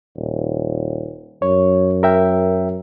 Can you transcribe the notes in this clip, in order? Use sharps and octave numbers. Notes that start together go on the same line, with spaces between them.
D#1
F#2 C#5
A#4 E5 G5